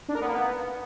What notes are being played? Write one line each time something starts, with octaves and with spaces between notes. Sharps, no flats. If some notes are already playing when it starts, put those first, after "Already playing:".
D4
A#4
B3
A#3
B3